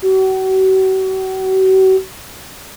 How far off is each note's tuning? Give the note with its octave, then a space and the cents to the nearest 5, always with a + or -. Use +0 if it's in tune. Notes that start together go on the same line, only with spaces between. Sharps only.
F#4 +40